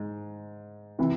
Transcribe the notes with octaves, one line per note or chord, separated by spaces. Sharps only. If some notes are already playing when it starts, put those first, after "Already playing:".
Already playing: G#2
C3 E3